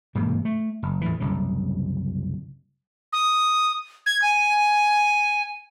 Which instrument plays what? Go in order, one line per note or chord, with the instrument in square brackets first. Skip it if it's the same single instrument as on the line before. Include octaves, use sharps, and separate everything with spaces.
[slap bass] E1 G#2 C3 A#3
A3
F#1
E2 A2 E3
F#1 C2 C#3
[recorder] D#6
G#6
G#5